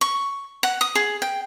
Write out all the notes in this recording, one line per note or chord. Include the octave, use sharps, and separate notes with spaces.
C#6
F#5
D#6
G#4
G5